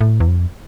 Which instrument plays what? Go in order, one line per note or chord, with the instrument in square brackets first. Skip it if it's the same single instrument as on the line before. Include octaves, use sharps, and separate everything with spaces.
[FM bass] A2
E2
F2